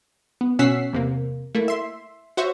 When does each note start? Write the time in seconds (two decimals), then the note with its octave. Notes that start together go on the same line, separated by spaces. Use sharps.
0.41 B3
0.59 B2 C#4 F#5 E6 B6 C7
0.93 E2 C3 A#3
1.55 A3 A#3 E4
1.68 E5 C6
2.37 F#4 C5 C#5 E5 C#6